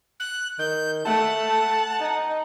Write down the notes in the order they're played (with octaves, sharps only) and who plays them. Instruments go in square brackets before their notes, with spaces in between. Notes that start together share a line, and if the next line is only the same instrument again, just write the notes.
[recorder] F#6
[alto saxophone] D#3 [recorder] G6
[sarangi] A3 [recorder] F#5 [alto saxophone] A5
[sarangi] D#4